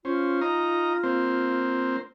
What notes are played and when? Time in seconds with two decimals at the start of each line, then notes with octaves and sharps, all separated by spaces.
0.05 C#4 F4 C5
0.41 D#4 A#5 D#6
1.03 A#3 C4 C5